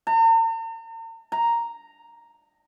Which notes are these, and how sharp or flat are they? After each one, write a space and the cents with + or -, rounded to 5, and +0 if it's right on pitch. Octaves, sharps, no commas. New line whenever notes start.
A#5 -45
A#5 +0